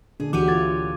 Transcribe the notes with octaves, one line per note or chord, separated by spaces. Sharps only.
A#2 D3 D4 G#4
D2 E3 F#4 G4 C#5 D6 D#7
F4 A4 D6 G#6 A6